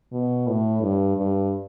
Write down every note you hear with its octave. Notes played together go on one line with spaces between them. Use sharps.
B2
A2
G2
G2